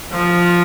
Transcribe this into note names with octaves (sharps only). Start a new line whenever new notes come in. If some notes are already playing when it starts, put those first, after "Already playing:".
F3